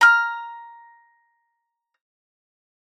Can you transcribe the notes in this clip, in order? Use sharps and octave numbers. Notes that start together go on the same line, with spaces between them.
A#5 F6